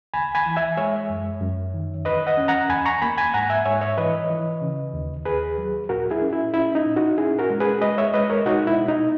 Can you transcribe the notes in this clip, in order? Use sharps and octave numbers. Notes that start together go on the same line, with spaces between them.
C#2 G#5 B5
G#5 B5
E3
E5 G#5
G#3 C#5 E5
F#2
F#2
D#3
E2 B4 D#5
D#5 F#5
C#4
F#5 A#5
E2 G#5 B5
A#5 C#6
A#3 G#5 B5
G#5 B5
G#2 F#5 A#5
E5 G#5
G#2 C#5 E5
C#5 E5
E3 B4 D#5
E3
C#3
D#2
D#2 G#4 B4
F#3
A#2 F#4 A#4
E4 G#4
C#4
E4
C#4 E4
D#4
A#2
D#4 F#4
C#4 E4 G#4
F#4 A#4
G#3
G#4 B4
G#3 B4 D#5
C#5 E5
G#3 B4 D#5
A#4 C#5
B2 D#4 F#4
E4
B2
D#4